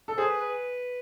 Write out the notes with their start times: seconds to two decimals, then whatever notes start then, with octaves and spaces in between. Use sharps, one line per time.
0.08 A4
0.17 G#4 C5
0.29 B4
0.41 B4